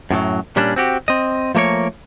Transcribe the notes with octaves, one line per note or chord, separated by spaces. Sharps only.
F#2 A2 E3 F#3
A#2 G3 C#4 D4
C4 F#4 G4
C4 D#5
F3 A3 A#3 A#4 C#5